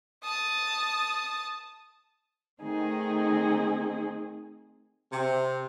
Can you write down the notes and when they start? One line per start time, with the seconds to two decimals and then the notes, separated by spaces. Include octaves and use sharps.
0.24 A5 D#6
2.62 D#3 A3 C4 D#4 G#4
5.11 C3